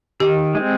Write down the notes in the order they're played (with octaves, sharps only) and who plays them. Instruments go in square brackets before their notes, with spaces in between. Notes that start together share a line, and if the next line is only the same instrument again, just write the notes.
[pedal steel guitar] D#3 [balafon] G4
[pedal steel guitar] G#3 C4